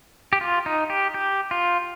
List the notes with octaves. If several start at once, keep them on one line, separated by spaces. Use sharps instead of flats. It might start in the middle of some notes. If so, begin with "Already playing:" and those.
G4
F4
D#4
G4
G4
F4